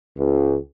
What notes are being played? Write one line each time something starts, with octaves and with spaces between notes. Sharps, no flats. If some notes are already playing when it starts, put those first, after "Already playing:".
C#2